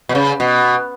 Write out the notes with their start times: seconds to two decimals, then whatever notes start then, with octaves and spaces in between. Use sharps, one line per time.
0.09 B2
0.15 C#3
0.40 B2